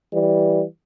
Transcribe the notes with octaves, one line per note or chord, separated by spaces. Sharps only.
E3 G3